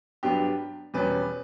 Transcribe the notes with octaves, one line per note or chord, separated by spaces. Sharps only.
G2 F#3 B3 D4 G4
E2 B2 G3 C#4 B4